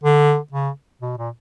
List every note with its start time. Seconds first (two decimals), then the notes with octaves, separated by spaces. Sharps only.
0.04 D3
0.52 C#3
1.02 B2
1.18 A#2